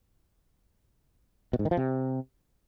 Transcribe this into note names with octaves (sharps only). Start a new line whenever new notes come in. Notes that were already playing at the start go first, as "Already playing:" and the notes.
B2
G#2
D#3
F3
C3